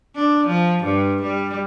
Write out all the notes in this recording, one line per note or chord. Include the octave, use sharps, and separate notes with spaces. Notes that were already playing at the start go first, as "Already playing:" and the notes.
D4
F3
G2
G3